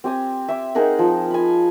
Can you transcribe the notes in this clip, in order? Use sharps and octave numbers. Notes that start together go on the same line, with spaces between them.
C4 G4 G#5 D#6
E5 D6
D#4 G#4 A#4 F#5
F3
G#5 B5